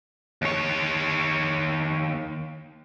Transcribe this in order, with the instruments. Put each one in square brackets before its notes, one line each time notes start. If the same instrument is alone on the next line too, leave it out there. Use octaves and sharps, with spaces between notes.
[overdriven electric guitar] D#2 C#5